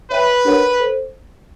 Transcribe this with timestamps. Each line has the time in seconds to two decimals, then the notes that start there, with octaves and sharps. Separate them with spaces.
0.10 B4 C#5 E5 G5 B5
0.45 D4 G4 A#4 C#5 F#5
0.79 A4 C5